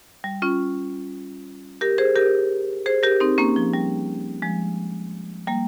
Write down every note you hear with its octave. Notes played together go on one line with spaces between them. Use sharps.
G3
C#4 F4
G4 A#4
G#4 C5
G4 A#4
G#4 C5
G4 A#4
C4 D#4
A#3 C#4
F3
G3
F3 G#3
G3 A#3